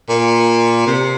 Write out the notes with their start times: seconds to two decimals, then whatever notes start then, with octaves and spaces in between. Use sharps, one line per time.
0.09 A#2
0.87 C3